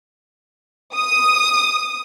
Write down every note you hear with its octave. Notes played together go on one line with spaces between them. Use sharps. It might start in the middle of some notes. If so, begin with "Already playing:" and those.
D#6